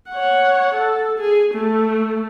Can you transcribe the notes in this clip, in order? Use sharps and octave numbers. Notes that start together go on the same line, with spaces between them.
C#5 F#5
A4
G#4
A3